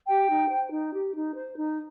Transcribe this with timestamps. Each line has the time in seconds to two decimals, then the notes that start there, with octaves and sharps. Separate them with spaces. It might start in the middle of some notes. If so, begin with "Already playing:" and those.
0.07 G4 G5
0.28 D#4
0.50 C5
0.71 D#4
0.93 G4
1.14 D#4
1.35 C5
1.56 D#4